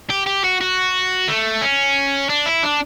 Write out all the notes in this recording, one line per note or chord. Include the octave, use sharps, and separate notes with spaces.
G4
G4
F#4
F#4
A3
C#4
D4
E4
D4